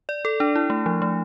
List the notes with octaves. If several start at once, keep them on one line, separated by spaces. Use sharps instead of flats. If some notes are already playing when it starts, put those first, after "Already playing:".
D5
A4
D4
E4
A3
F3
A3